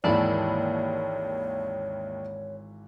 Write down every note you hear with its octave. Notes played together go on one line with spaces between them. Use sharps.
G#1 D#2 E3 E4 C#5 D5 A5 B5